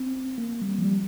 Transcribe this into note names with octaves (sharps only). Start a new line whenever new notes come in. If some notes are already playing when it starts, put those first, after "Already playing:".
Already playing: C4
A#3
G3
F3
G3